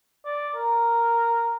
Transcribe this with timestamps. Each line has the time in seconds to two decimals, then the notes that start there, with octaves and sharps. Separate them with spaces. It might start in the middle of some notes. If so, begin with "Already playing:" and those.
0.25 D5
0.55 A#4